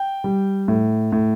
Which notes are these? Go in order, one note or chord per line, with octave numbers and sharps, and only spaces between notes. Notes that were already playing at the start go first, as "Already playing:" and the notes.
Already playing: G5
G3
A2
A2